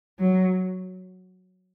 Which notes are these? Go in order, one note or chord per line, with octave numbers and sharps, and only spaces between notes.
F#3